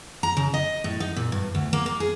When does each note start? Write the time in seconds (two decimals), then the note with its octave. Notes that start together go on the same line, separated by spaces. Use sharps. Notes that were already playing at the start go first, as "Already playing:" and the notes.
0.23 A#5
0.37 C#3
0.54 D#5
0.84 A2
1.00 D#4
1.16 A#2
1.32 G2
1.55 D2
1.73 A#3
1.86 A#3
2.00 G#4